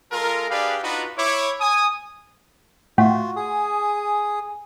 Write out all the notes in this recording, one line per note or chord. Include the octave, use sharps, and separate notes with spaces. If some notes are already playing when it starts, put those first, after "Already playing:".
G#3 F4 A4 A#4
D4 G4 G#4 B4 D5 F5
D4 D#4 F4 F#4 B4
E4 C#5 D6
G#5 D#6
A2 F4 F#4 F#5
G#4 G#5 D#6
G#5